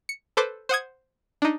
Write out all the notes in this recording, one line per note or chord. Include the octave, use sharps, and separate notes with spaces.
C#7
A4 B4 C5 D6
C5 F#5 D#6 G#6
D4 D#4